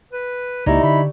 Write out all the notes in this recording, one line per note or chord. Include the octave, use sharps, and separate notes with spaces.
B4
C#2 A#3 D#4 E4 G4 D5 A#5
D3 B5